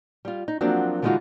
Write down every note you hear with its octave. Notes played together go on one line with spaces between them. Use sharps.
G3 F4
D#4
F3 F#3 A#3 C4 D4 F#4
D3 E3 G#3 D#4 F4 F#4